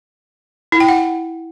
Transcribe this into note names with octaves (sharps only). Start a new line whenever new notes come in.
E4
G5
F#5